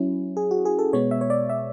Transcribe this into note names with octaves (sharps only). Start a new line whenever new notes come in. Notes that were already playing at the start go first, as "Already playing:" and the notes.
Already playing: F#3 C#4 E4
G#4
F#4
G#4
A4
B2 G#3 B3 C#5
E5
C#5
D5
E5